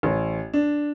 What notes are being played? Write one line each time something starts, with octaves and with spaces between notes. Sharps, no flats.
A1
D4